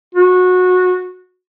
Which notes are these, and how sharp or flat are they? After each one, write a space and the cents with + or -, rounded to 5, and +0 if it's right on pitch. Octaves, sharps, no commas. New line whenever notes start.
F#4 -20